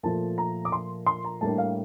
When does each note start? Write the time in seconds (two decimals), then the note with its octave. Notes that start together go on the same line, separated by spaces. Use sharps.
0.03 A#2 F3 A3 A5
0.38 A#5
0.65 D6
0.72 C6
1.06 C6
1.25 A#5
1.41 A2 G3 A#3 D4 A5
1.58 F5